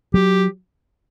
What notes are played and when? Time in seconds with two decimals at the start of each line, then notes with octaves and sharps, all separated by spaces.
0.14 F#3 G4